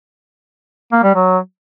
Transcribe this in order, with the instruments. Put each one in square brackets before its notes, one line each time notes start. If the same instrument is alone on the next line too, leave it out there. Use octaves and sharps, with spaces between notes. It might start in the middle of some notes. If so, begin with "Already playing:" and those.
[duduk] A#3
G3
F#3